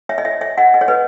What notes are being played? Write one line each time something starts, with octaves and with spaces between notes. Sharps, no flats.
C#5 E5
D#5
C#5 E5
C#5 E5
D#5 F#5
D#5
C#5
B4 D#5